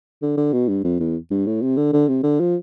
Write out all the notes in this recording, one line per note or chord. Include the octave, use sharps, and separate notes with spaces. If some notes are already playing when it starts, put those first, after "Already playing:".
D3
D3
B2
G2
F2
E2
G2
A2
C3
D3
D3
C3
D3
F3